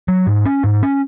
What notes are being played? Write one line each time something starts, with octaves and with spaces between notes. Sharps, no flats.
F#3
G#2
C#4
G#2
C#4